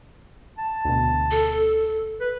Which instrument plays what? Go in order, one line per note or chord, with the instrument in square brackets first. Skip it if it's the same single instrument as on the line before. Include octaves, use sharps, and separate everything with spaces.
[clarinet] A5
[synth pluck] D2 B2
[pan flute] A4
[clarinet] B4